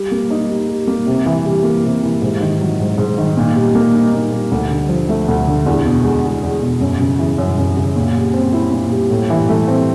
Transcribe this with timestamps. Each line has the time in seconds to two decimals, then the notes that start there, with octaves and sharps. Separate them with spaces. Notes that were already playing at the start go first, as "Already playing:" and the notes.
Already playing: G3
0.11 A#3
0.30 D#4
0.49 G4
0.69 G3
0.87 A#3
1.07 C3
1.26 E3
1.46 G3
1.64 A#3
1.84 C3
2.03 E3
2.22 G#2
2.41 D#3
2.61 F#3
2.80 G#2
2.98 G#2
3.18 D#3
3.37 A#2
3.56 G3
3.75 A#3
3.94 D#4
4.14 A#2
4.32 G3
4.51 D2
4.70 D3
4.89 F3
5.09 A3
5.28 D2
5.47 D3
5.66 E2
5.85 B2
6.04 G#3
6.24 E2
6.43 E2
6.62 B2
6.81 F#2
7.00 C#3
7.19 E3
7.38 F#2
7.58 F#2
7.77 C#3
7.96 A#2
8.15 G3
8.33 C4
8.53 E4
8.71 A#2
8.92 G3
9.10 A2
9.30 E3
9.49 A3
9.68 C4